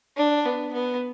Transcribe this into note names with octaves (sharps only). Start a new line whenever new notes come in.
D4
B3
B3